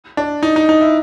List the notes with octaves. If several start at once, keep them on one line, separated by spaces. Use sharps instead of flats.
D4
D#4
D#4
D#4
E4